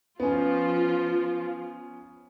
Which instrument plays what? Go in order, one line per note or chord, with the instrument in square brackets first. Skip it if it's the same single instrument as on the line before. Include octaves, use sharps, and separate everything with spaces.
[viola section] F3 F4 [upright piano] B3 C#4